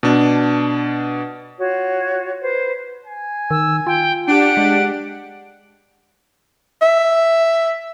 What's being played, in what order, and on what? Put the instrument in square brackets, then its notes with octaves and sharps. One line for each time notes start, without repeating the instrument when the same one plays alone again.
[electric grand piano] B2 D4
[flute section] F4 F#4 C#5
B4 C5
[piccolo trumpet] G#5
[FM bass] D#3 [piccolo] E6
[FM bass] F4 [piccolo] G5
[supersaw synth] D4 G4 [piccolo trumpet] F#5 [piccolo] D7
[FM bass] G#3
[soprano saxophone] E5